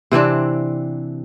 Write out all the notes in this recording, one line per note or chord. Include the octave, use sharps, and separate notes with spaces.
C3 E3 C4 D4